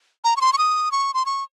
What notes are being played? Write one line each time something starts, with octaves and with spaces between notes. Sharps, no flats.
A#5
C#6
C6
C#6
D#6
C#6
C6
C#6